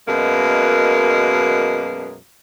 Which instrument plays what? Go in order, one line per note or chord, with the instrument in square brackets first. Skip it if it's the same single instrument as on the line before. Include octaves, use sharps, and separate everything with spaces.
[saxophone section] F#2 B2 G#3 A#3